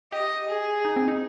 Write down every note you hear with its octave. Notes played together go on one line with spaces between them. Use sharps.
G4 D#5
G#4
D#4
C4
D#4